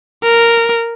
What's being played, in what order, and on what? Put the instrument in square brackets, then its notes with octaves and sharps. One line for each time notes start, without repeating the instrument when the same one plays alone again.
[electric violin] A#4